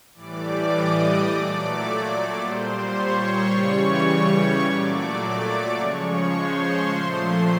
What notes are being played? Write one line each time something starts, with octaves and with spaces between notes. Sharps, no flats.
A2 E3 G3 D5 D6
D#5 D#6
A#2 F#3 A3 D5 D6
A#2 G3 C5 C6
C#5 C#6
C#3 E3 G3 C#5 C#6
C#5 C#6
A#2 F#3 A3 D5 D6
D5 D6
C#3 F3 G#3 C#5 C#6
C5 C6
A#2 F3 A3